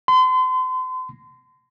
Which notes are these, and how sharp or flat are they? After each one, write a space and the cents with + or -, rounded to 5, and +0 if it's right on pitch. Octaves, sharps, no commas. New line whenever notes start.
C6 -35